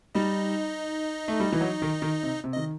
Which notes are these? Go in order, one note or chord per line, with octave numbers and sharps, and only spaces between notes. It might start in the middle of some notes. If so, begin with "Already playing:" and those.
G3 D#4 D#5
A3
G3
E3
F#3
D#3
D#3
C3
C3
D#3 D#5